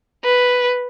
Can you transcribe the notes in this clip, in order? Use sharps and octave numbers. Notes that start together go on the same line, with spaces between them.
B4